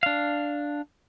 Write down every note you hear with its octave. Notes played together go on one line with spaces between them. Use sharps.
D4 F5